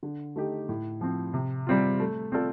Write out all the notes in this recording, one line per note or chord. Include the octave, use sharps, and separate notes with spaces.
D3
A3 D#4 G4
A2
F3 C4
C3
G3 C4 F4
A3
C4 F4 A4 D5